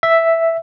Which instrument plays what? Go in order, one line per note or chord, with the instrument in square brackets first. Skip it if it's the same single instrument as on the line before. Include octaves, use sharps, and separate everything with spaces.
[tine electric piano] E5